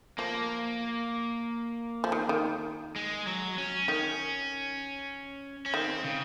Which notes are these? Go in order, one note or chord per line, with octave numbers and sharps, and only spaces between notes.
F3 A#3
F3
D#3
D#3
G#3
F#3
C#4
D#3 C#4
C#4
D#3 C4
C#3